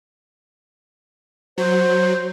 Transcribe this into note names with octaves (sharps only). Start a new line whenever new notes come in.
F#3 C5